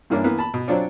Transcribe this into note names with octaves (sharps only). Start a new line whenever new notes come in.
G2 E3 A#3 C#4 D4 E4
E3 A#3 B3
A5 B5
B2
F#3 C4 D4 F4 C#5 D5